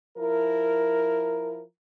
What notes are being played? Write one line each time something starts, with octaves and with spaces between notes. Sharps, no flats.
F3 E4 A#4